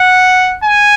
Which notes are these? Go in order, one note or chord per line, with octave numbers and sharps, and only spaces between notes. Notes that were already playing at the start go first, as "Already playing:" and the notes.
Already playing: F#5
G#5